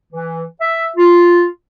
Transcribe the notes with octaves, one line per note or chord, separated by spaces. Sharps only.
E3
E5
F4